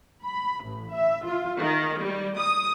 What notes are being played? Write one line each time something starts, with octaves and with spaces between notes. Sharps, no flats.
B5
A1
E5
F4
D#3
G3
D#6